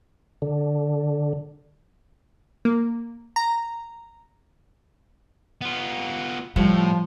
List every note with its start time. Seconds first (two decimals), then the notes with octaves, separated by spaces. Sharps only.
0.42 D3
2.65 A#3
3.36 A#5
5.61 B3 F4
6.56 A2 F3 G3